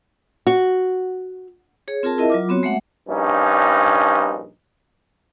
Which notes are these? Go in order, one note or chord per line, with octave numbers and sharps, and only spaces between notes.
F#4
G#4 C#5
C4 F4 G#4 A#4 A5
E4 A#4 D#5 E5
F#3 F4 D6
B3 C4 F#4 C#5
G#3 A3 E5 F#5
A#1 G2 C#4 D#4